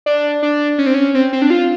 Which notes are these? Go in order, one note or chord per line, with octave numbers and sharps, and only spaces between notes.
D4
D4
C#4
C4
C#4
C4
C4
D4
F4